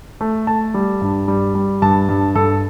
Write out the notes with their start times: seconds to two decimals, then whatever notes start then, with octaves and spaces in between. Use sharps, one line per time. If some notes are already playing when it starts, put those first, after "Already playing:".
0.21 A3
0.47 A3 A5
0.74 G3
1.01 G2
1.28 G3
1.55 G3
1.82 G2 A5
2.09 G2
2.35 G2 A4